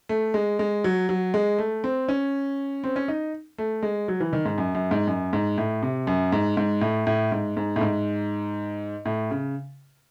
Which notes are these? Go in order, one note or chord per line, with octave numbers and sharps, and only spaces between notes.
A3
G#3
G#3
F#3
F#3
G#3
A3
C4
C#4
C4
C#4
D#4
A3
G#3
F#3
E3
D#3
G#2
F#2
F#2
G#2
F#2
G#2
A2
C3
F#2
G#2
G#2
A2
A2
G#2
G#2
A2
G#2
A2
C#3